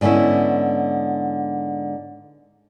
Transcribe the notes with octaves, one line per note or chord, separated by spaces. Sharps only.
G#2 D3 B3 C#4 E4